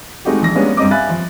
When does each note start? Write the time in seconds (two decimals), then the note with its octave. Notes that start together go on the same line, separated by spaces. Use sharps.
0.25 G#3 A3 C4 D#4 F#4 G4
0.42 A#1 A#6
0.55 G3 G#3 A#3 B3 C#4 D4
0.77 G2 G3 C4 D#5 A#5 D6
0.91 E5 F5 G#5 B5 F#6 A6
1.09 F3